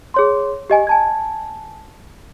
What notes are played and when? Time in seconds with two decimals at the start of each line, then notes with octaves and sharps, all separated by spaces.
0.14 G#4 C#5 C6
0.70 G4 D#5 G#5
0.87 G#5 A5 G#6